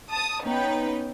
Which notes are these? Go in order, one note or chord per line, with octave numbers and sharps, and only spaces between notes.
A5 D#6
B3 C#4 D#4 B4 G5